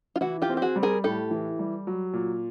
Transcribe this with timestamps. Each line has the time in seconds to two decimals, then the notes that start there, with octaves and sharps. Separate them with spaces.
0.16 F4
0.21 E3 E4 F#4
0.42 F4 G4
0.49 C4
0.57 G4
0.62 F#4 G#4
0.76 G3
0.83 G#4 A#4
1.04 A2 G4 A4
1.31 E3
1.59 G3
1.87 F#3
2.13 A#2